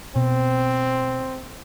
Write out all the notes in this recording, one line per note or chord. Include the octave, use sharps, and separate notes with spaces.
B2 C4